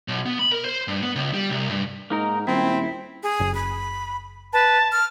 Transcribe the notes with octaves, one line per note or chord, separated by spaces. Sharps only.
B1
B3
B5
A#4
C5
G2
B3
C#2
G3
C2
G2
G#2 A#3 D#4 A#4
D#1 C4 E4
G#4
F#1
B5
B4 A5
F6